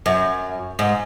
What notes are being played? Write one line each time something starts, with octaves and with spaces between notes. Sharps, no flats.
F#2
G#2